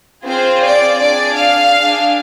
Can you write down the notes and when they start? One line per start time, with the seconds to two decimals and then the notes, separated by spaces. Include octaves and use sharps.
0.25 C4 F4 G#4 C5
0.63 D5
1.00 D4 G#4 D5
1.36 F5
1.73 D4 G#4